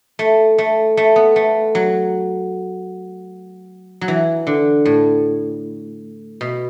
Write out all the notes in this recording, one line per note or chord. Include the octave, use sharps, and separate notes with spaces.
A3
A3
A3
B3
A3
F#3
F#3
E3
D3
A2
B2